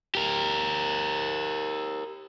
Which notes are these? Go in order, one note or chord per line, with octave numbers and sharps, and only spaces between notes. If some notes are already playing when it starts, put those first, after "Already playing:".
G4 A#4